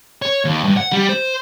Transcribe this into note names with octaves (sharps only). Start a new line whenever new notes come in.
C#5
D#2
G2
F#5
G3
C5